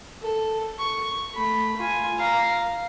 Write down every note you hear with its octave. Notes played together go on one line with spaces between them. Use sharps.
A4
C#6
A3 B5
F4 G#5
F5 A#5